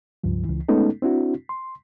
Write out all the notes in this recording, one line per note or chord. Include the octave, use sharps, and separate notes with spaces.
C#2 G2 F3
C#2 E3
G#3 A3 B3 C#4 D#4 A4
C4 D4 E4 F#4
C6